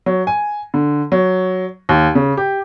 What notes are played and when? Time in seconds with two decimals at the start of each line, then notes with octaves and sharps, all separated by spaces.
0.06 F#3
0.27 G#5
0.74 D3
1.12 F#3
1.89 D#2
2.15 C#3
2.37 G4